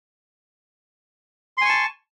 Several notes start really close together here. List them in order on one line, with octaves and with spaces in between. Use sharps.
C6 G#5 C#6 A5